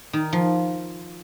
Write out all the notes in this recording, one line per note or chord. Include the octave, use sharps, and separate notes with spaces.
D#3
F3